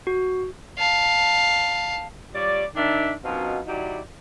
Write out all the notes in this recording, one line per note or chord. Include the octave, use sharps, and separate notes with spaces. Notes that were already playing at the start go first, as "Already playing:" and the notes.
F#4
F5 A5
G3 F4 C#5 D5
D#3 D4 E5
F#2 B2 C4 D#4 F4 F5
F#3 D#4 E4 G4 D5